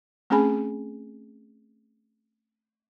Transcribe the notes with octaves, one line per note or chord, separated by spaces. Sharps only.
A3 C4 C#4 G#4 G#5 B5